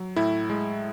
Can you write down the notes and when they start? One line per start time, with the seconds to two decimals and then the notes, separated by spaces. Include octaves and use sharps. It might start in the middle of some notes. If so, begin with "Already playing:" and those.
Already playing: F#3
0.16 A2 E4
0.50 G#3